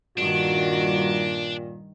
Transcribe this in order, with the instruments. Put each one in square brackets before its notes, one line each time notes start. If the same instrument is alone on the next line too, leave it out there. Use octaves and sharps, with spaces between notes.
[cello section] G2 D#3 [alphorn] A#2 [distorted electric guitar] D4 [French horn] F#4